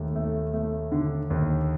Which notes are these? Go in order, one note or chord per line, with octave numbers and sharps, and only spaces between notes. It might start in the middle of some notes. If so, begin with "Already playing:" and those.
Already playing: D#2 A3
A3
A3
D3
D#2